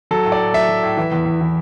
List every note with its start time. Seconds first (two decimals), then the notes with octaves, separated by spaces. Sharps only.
0.11 F#3 A4
0.25 A2
0.32 D5
0.40 A2
0.54 F#3 E5
0.69 F#3
0.83 A2
0.97 E3
1.12 E2
1.26 E2
1.41 E3